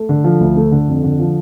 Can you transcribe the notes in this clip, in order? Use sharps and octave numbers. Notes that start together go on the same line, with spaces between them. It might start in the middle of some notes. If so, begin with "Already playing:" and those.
Already playing: A3
D3
F3
D2
A3
D3
F2
D3
F3